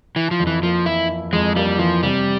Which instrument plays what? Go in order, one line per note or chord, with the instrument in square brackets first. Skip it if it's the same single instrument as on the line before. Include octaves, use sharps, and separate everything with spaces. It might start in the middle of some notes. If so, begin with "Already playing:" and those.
[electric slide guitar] E3 [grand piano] E4
[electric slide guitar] F3
[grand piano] F2
[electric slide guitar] E3
[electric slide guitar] F3 [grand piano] A#3
[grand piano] E3 [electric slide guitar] E4
[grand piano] E4
[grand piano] F2 [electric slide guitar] G#3
[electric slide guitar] G3 [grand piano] A#3
[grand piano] E3 [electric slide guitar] F3
[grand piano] C3 [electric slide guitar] G3